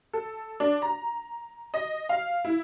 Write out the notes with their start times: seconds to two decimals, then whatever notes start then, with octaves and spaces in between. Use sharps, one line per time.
0.13 A4
0.60 D4
0.82 A#5
1.74 D#5
2.09 F5
2.45 E4